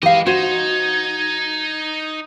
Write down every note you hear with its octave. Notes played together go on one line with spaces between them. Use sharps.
E3 G#3 G4 D#5 F5
D#4 F#4 C5 G#6